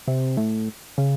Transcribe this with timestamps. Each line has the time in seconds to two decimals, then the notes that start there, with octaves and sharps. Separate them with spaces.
0.08 C3
0.37 A2
0.98 C#3